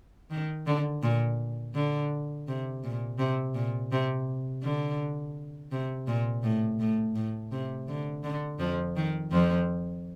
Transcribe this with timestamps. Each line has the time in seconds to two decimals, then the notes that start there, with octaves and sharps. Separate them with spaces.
0.31 D#3
0.67 D3
1.03 A#2
1.75 D3
2.48 C3
2.84 A#2
3.19 C3
3.55 A#2
3.92 C3
4.63 D3
5.72 C3
6.07 A#2
6.43 A2
6.80 A2
7.16 A2
7.52 C3
7.88 D3
8.24 D3
8.59 F2 F3
8.96 D#3
9.32 F2 F3